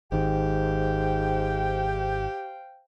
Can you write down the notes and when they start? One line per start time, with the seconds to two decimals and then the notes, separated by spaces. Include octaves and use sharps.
0.12 G#1 G#2 D#3 G4 C5 F5 G5